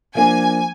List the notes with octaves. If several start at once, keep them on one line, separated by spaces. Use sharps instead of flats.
F3 A#3 D4 G#5